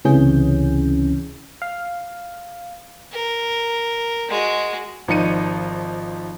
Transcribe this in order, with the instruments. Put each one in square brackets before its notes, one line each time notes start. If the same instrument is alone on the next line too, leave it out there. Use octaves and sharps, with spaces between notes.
[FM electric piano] C#2 C3 E3 C#4 G#4 G6
F5
[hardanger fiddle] A#4
G#3 F#4
[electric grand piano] G#1 F3 D#4 C#7 D#7